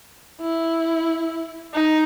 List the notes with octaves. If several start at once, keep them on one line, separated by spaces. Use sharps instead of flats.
E4
D#4